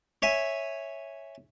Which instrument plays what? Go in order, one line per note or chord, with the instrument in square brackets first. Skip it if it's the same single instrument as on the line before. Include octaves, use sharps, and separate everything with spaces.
[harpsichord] C#5 E5 G#5